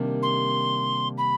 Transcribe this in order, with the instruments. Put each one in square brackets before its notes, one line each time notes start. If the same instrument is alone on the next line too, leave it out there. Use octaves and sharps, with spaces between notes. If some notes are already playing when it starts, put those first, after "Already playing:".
Already playing: [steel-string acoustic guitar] C3 D#3 G3 A#3 D4
[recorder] C6
B5